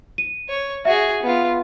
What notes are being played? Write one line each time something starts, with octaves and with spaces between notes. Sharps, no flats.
D#7
C#5
F#4 G#4 E5
B3 F4